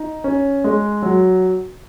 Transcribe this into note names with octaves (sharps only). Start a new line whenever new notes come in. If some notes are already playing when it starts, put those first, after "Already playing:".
Already playing: D#4
C#4
G#3
F#3